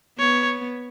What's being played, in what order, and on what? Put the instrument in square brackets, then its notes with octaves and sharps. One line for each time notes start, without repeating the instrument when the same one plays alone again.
[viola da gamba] B3 [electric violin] C#5